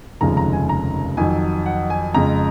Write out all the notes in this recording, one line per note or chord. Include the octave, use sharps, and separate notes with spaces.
F1 D#2 C#3 F3 G#3 A#5
A#5
G#5
A#5
F2 D#3 F#3 G#5
F#5
G#5
F2 C#3 G#3 A#5